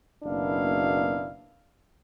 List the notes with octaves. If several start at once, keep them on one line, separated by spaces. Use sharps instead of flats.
F#1 B2 A#3 D4 E4 F5